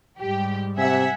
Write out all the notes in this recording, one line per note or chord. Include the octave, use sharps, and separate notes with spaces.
G#2 G3 G4
C3 E5 F#5 G#5